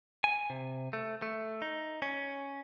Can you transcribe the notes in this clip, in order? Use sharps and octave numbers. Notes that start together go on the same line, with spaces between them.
G#5
C3
A3
A3
D#4
C#4